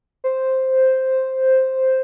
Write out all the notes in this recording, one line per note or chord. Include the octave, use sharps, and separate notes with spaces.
C5